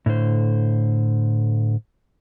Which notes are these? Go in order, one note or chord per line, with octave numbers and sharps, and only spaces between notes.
A2 D3 C5